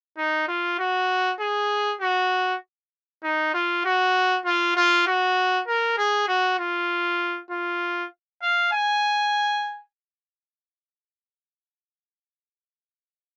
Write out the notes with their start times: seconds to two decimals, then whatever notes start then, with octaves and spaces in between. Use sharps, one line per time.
0.18 D#4
0.48 F4
0.79 F#4
1.40 G#4
2.01 F#4
3.24 D#4
3.54 F4
3.85 F#4
4.46 F4
4.76 F4
5.07 F#4
5.68 A#4
5.98 G#4
6.28 F#4
6.59 F4
7.51 F4
8.42 F5
8.72 G#5